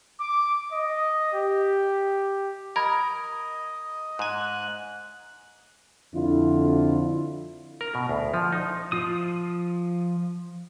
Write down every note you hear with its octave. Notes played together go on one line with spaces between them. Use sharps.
D6
D#5
G4
A#4 D#5 A#5 B5 G#6
G#2 G#5 F#6
F2 D3 E4 F4
A#4
B2
D2
F3
D#4
F3 F4 D#6